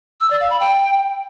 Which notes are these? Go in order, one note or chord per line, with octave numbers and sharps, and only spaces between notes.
E6
D5
F5
B5
G5